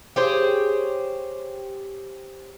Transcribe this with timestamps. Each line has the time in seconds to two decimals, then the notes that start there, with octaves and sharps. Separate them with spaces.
0.16 G4 G#4 C5 C#5